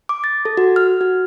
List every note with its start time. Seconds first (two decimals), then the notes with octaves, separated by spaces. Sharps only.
0.09 D6
0.24 A6
0.45 A4
0.57 F#4
0.76 F6
1.01 F#4